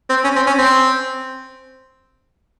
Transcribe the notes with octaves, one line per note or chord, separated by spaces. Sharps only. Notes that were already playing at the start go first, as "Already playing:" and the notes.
C4
C#4
C4
C#4
C4